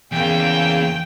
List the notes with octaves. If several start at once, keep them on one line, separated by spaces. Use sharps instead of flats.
E2 C#3 A#3 G5 G#5